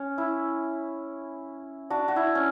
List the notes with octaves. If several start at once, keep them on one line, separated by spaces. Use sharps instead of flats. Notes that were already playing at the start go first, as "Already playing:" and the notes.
Already playing: C#4
E4
D4 F#4
F#4
E4
C#4